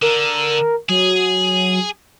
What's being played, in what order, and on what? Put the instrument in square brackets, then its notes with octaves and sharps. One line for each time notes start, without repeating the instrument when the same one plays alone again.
[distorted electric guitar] D3 [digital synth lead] A#4
[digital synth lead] F#3 [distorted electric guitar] G#4